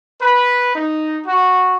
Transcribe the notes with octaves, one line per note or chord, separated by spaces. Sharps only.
B4
D#4
F#4